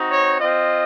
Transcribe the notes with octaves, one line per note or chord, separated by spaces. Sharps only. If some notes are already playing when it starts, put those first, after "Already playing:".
Already playing: C4 D#4 F#4
C#5
C4 F4 D#5